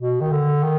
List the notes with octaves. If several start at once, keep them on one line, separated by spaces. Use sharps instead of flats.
B2
D#3
D3
D#3